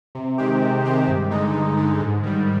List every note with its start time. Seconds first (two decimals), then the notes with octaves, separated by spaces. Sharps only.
0.15 C3
0.38 D#3 G#3 C4 G4
0.62 C3
0.85 D#3 G#3 C4 G4
1.08 G2
1.31 D3 G#3 D#4
1.55 G2
1.77 D3 G#3 D#4
2.00 G#2
2.23 D#3 G3